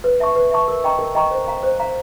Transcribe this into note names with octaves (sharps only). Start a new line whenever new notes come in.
B4
E5 A5 C#6
B4
E5 A5 C#6
A#4
D#5 G5 A#5 C#6
A#4
D#5 G5 A#5 C#6
C5
F5 A#5
C5
F5 A#5